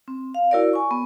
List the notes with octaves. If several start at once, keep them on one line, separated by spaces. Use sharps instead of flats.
C4
F5
E4 F#4 A#4 C#5 D5
G#5 C#6
B3